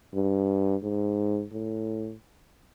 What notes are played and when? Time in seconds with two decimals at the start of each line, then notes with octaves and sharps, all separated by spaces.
0.14 G2
0.83 G#2
1.52 A2